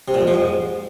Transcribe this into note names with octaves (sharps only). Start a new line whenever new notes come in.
C3
A#2
F2
F3
G#2